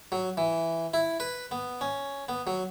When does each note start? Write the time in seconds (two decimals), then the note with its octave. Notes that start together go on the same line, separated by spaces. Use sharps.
0.12 F#3
0.37 E3
0.94 E4
1.20 B4
1.51 B3
1.81 C#4
2.29 B3
2.47 F#3